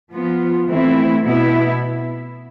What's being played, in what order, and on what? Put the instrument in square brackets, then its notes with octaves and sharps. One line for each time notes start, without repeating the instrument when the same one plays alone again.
[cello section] F3 B3 F4
E3 A3 C4 E4
B2 B3 E4